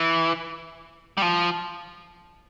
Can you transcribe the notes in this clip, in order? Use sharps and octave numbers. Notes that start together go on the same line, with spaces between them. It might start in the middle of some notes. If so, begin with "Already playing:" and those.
Already playing: E3
G3
F3